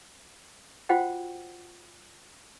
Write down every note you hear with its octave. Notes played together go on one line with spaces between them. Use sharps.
F4 F#4 C5 F#5 G5